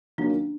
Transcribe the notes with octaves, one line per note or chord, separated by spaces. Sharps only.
D#3 F#3 A#3 C#4 D4